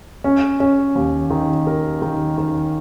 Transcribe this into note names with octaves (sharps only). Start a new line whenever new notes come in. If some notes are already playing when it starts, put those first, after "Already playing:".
C#4
C#4
D#2
D#3
A#4
D#3
D#3